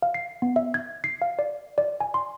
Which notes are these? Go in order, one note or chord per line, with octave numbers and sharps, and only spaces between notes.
F5
C7
B3
E5
G#6
C7
F5
D5
D5
G#5
C6